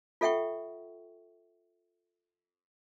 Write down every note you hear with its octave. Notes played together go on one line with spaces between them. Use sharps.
F4 A4 E5 F#5 G5 C#6